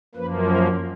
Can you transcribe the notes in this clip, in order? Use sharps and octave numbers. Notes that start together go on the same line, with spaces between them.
F#2 F3 A#3 B4
A#4